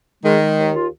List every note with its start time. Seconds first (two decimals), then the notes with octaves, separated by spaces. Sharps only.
0.24 D#3 G#3
0.41 G#3
0.57 D#2
0.75 F4